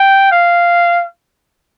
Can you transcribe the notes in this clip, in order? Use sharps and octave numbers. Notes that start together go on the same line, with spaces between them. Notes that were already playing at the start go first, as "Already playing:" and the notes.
Already playing: G5
F5